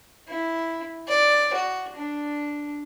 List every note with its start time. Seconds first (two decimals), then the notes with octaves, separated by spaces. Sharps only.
0.28 E4
1.08 D5
1.54 F#4
1.96 D4